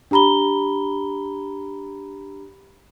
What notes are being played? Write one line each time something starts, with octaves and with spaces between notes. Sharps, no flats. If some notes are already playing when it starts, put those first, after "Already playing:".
D4 G4 A#5 B5 G7